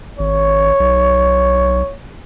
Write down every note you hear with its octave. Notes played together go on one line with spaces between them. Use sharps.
G#1 C#5
B1